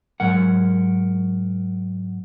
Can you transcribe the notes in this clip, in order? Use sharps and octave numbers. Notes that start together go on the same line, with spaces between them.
G#2 F#3 A#4 F#5